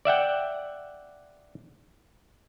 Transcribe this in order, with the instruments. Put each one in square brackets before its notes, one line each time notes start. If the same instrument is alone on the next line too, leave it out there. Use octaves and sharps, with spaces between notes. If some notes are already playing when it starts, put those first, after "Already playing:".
[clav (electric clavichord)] D5 E5 F#5 G5